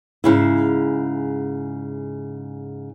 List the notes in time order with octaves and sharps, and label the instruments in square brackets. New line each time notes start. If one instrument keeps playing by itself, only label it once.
[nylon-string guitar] G#2 C#3 E4